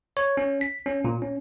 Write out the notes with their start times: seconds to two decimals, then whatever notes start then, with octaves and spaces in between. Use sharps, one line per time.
0.17 C#5
0.37 C#4
0.61 B6
0.86 C#4
1.04 A#2
1.22 C#4